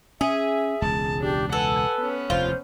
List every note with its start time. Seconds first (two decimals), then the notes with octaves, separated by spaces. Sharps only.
0.21 C#4 G#4 E5
0.82 E1 C#2 A5
1.22 D4 G4
1.52 A4 B4 F#5 G#5
1.97 B3 C#4
2.30 F1 D#2 F4 C5